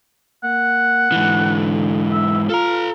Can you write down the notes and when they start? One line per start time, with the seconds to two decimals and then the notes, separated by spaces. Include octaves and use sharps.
0.44 A#3 F#5
1.12 G#2 D3 E3
2.12 E5
2.49 F4 A4 F5 A#5